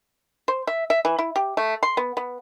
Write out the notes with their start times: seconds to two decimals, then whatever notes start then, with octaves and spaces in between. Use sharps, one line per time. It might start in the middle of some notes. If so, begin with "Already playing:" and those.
0.48 C5
0.67 E5
0.90 E5
1.05 E3
1.19 E4
1.36 G4
1.57 A3
1.83 C6
1.97 B3
2.17 B3